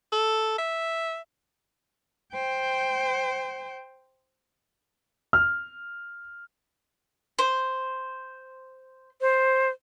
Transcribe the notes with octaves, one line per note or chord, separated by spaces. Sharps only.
A4
E5
C5 G5
F6
C5
C5